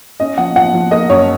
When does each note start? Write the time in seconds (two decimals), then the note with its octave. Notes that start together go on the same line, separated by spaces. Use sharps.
0.20 C#4 D#5
0.38 F3 F#5
0.56 F3 F#5
0.74 F3
0.91 A#3 D#5
1.10 F#2 C#5